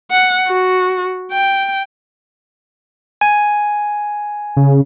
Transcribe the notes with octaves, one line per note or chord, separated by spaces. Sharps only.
F#5
F#4
G5
G#5
C#3